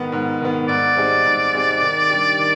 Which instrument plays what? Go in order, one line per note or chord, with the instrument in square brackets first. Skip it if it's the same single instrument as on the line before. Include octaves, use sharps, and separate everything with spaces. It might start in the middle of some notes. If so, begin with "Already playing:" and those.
Already playing: [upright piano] G#2 D#3 B3
G#2
D#3 B3
[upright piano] G#2 [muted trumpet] D5
[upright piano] G3 C4 D#4 G#4
G#2
G3 C4 D#4 G#4
D#3
G3 D4 G4
D#3